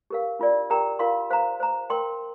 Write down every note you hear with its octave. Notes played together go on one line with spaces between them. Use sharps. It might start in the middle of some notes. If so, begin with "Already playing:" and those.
G4 A#4 F5
D4 F4 A#4 D5
G4 A#4 G5 A#5
F4 A#4 F5 C6
C5 F5 A#5
C5 A#5
A#4 G5 C6